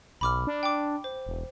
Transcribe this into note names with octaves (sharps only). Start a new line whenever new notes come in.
B1 B5 D6 F6
D4
G5 D6
C5
E1